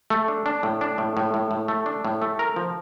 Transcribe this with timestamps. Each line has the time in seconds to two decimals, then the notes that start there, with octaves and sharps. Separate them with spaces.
0.10 A3
0.28 D4
0.46 D4
0.63 A2
0.81 D4
0.98 A2
1.17 A2
1.34 A2
1.51 A2
1.68 A3
1.86 D4
2.05 A2
2.22 A3
2.39 A#4
2.56 F3